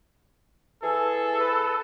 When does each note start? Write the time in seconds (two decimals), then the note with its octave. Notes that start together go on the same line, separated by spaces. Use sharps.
0.83 E3 G#4 A4
1.40 B4